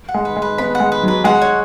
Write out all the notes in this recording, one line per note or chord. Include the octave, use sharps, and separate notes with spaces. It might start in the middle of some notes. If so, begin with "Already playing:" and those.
F#5
G#3
B4
G#3
B4
B3 B5
F#5
G#3
B4
F#3
B4
G#3 F#5
C#5